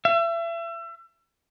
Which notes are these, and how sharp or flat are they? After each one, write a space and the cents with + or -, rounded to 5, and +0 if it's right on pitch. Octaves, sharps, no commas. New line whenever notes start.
E5 +35